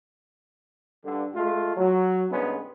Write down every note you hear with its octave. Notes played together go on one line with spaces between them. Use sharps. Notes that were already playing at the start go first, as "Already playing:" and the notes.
G2 D3
G#3 A3 F4
F#3
C2 G2 G#3 B3 C#4